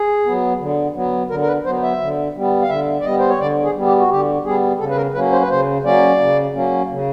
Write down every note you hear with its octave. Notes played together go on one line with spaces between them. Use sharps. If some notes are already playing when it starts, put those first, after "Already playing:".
Already playing: G#4
F#3 B3
D3
F#3 B3
D3 A#4
A#4
B4
F#3 B3 C5
E5
D3
G3 B3
F5
D3 E5
D5
G3 B3 D#5
C5
C#5
D3 D5
G#4
G3 B3
G4
F#4
D3 G4
G3 B3 G#4
C#3 A4
B4
A#4
F#3 A#3 C#4 B4
C5
B4
C#3 C5
F#3 A#3 C#4 D5
C#3
F#3 A#3 C#4
C#3